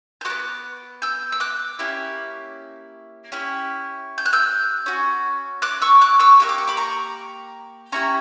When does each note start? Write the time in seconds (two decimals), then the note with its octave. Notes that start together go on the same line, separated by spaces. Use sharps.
0.21 G6
0.25 F#4 D6 F#6
0.30 B3
1.02 E6 G6
1.32 E6
1.40 D6 F#6
1.79 A#3 C#4 E4 G4
3.32 C#4 E4 G4
4.18 G6
4.26 F#6
4.33 E6 G6
4.86 C#4 F#4
5.62 D6 F#6
5.82 C#6 E6
6.01 D6 F#6
6.20 C#6 E6
6.40 A#3 E4 G4 E6
6.49 D6
6.58 C#6
6.67 B5 D6
6.77 A#5 C#6
7.92 C#4 E4 G4 A#5 C#6